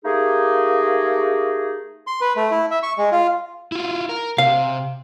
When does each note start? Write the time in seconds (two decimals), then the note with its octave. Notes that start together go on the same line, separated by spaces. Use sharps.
0.05 A3 A#3 D#4 G4 G#4
2.07 C6
2.21 B4
2.37 A3
2.51 E4
2.71 E5
2.83 C#6
2.98 G#3
3.12 F4
3.72 E4 F4
4.09 A#4
4.38 C3 F5